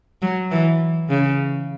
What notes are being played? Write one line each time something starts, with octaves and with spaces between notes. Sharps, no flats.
F#3
E3
C#3